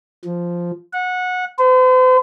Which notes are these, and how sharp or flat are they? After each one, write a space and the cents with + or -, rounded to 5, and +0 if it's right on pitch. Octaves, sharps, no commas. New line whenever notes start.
F3 -5
F#5 -20
C5 -45